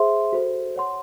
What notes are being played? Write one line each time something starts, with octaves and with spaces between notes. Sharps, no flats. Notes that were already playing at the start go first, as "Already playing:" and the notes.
Already playing: G#4 C5 E5 C6
F#4 A4 C5
C#5 F#5 C6